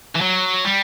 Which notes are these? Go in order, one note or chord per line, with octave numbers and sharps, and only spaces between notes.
E3
F#3
G3